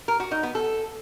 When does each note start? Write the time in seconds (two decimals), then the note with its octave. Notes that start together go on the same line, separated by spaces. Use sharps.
0.08 A#4
0.20 F#4
0.31 D#4
0.43 B3
0.55 A4